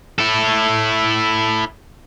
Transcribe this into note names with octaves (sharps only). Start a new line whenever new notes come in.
E4 A4